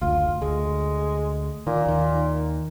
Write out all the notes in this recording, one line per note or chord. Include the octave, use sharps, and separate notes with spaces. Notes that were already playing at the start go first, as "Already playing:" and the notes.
F#1 D2 F4
D2 G#3
A#2 D#3
D#2 D#3